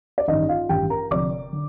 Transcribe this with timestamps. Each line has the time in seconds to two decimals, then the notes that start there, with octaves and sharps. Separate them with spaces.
0.18 D5
0.28 A1 G2 D#3 D#4 D#5
0.49 F4 F5
0.69 A1 G2 D#3 G4 G5
0.90 A#4 A#5
1.11 F1 F2 D3 D5 D6
1.52 D3